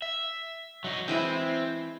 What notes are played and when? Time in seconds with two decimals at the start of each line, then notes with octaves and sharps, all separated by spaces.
0.02 E5
0.84 F#3 D#4
1.08 E3 G#3 C4 E4